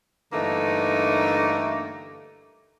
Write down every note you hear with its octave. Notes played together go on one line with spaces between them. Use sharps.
G2 D3 E3 A3 A#3 D#4